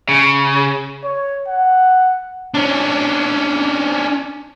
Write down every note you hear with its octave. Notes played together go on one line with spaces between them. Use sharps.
C#3
C#5
F#5
C#4 D4